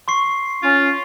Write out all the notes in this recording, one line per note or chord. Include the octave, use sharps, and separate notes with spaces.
C6 C#6 C7
C#4 F4